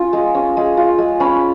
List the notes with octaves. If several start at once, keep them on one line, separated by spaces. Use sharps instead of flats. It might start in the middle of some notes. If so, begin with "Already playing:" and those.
Already playing: C#4 F4
G#3
C#4
G#3
F4
G#3
C#4 B5